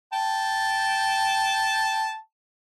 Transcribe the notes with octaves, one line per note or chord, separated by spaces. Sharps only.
G5 A5